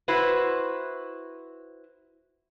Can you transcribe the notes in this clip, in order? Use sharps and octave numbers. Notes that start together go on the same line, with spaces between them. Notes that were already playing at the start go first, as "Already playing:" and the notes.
E4 F#4 B4 C5